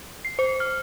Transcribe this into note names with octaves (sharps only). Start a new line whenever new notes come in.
C7
C5
F6